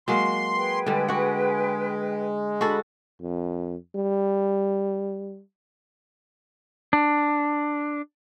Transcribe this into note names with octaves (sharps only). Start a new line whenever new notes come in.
F#3 G#3 A#3 C6
G#4 B4 G5
D3 G3 G#3
F#4 F#5
D4 F#4 G#4 A4 B5
F2
G3
D4